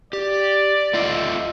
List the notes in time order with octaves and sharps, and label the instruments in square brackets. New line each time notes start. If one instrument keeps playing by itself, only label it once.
[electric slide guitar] G4 [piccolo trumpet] D5
[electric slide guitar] A3 F4 D#5